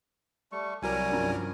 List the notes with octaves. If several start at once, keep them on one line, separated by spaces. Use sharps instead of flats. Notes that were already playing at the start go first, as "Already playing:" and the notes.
G3 A3 C#6
C2 F#3 G3 A#4 G#5
G2 F3 C#4